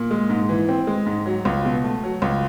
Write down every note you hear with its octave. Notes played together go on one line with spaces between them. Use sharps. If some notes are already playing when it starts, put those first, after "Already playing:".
Already playing: A#2
G#3
G#2
E3
C4
G#3
G#2
F#3
C#2
B2
A3
F#3
C#2